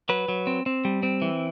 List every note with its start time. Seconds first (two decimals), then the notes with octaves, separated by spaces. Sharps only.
0.09 F#3 B4
0.28 F#3
0.47 C4
0.66 C4
0.85 G3
1.03 C4
1.22 E3